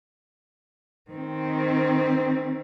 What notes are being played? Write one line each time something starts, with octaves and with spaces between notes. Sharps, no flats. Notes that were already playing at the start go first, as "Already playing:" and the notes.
D#3 C4